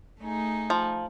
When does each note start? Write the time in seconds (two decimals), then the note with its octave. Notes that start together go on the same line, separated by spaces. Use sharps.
0.22 A3 D#4 G#4
0.70 F3